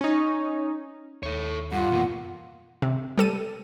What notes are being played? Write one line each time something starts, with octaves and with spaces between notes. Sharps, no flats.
C#4 D#4
D#2 A4 C#5
G2 F4 F#5
F#2 B2 E3 A#3
C3
G3 A4 D#7